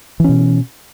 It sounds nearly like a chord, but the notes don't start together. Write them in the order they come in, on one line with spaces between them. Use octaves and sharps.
E3 C#4 B2